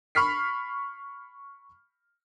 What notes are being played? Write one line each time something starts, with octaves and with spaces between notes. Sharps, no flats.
B5 C#6 F6 B6 C7